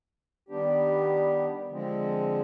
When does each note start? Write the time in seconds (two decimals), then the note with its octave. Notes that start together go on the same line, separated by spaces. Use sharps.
0.49 D#3 G3 B3 D4 G4
1.71 D3 F3 G#3 C4